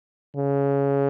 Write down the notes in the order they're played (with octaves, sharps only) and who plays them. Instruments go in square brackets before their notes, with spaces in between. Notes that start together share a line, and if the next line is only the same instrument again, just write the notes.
[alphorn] C#3